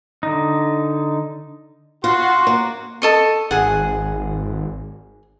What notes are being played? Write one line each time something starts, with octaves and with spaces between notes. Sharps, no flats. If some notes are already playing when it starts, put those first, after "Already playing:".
D3 D#4
F4 F#4 C6
A#3
A4 D#5 C#6
G#1 G#4 F#5